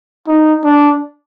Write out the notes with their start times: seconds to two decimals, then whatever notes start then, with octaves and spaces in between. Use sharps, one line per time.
0.27 D#4
0.64 D4